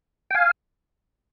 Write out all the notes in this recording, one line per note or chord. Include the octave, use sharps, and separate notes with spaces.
G5
F5 G#5